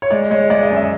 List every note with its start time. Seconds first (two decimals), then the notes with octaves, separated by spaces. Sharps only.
0.02 C#5
0.11 G#3 D5
0.30 G#3 C#5
0.50 G#3 D5
0.63 D#5
0.70 F#2
0.77 E5